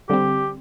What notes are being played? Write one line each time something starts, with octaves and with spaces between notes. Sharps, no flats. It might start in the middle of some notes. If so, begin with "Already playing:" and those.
D3 G3 C4 G4